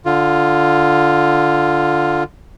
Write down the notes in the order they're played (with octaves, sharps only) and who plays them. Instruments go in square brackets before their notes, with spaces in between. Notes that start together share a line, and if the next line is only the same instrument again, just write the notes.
[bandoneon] D3 F4